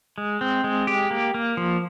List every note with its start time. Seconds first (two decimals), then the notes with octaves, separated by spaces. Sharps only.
0.18 G#3
0.41 C4
0.64 G#3
0.87 G4
1.11 A#3
1.34 A#3
1.57 F3